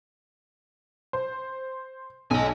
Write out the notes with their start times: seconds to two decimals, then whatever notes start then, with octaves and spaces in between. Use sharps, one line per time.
1.13 C5
2.31 B1 D#5 G#5